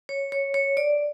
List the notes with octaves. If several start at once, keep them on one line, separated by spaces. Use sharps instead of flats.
C#5
C#5
C#5
D5